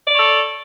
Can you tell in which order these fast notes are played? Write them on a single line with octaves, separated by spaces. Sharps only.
D5 C#5 A4